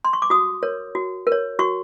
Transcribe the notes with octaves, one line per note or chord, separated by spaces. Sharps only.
C6
C#6
D6
F#4 D#6
A#4 C#5
F#4
A#4
C#5
F#4 C#6